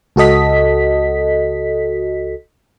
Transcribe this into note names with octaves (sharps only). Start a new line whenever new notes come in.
C#2 F#4 A4 D#5 B6